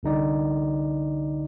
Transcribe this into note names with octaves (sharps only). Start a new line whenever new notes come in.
C2 D3 D#4 D5